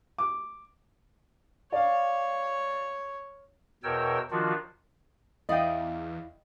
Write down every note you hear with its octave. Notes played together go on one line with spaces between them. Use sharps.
D6
C#5 D5 F5
E2 B2 A#4 C#5 G5 E6
D#3 F3 D4 F4 F#4
E2 E4 D5 D#5 F5 G5